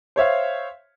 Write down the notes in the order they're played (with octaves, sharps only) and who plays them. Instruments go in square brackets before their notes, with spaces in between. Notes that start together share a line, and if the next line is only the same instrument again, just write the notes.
[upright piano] C5 C#5 E5 F5